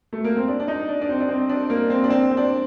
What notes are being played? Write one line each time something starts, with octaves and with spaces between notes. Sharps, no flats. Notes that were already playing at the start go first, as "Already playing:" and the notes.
A3
A#3
C4
D4
D4
D#4
D4
D4
C4
D4
C4
D4
A#3
C4
D4
C4
C4
D4